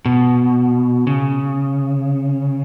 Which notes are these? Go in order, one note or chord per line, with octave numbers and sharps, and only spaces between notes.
B2
C#3